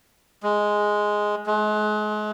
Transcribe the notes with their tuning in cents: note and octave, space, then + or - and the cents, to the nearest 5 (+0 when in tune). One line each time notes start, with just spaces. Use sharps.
G#3 +0
G#3 +35